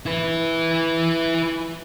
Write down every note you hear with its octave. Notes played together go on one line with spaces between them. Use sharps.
E4 B4